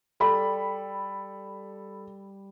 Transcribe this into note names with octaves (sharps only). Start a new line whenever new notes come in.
G3 A4 B5